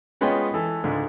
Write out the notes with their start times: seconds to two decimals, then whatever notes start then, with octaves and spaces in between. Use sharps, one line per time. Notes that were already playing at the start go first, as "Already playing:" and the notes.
0.21 G#3 B3 C#4 F4 D#5 G5
0.54 E3 A4
0.84 C#2 G#2 D3